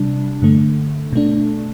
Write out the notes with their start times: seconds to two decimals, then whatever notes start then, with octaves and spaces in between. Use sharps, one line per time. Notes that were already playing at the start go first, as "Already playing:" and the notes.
Already playing: C3 G3 D4
0.42 G2 D3 A3
1.13 B2 A3 D4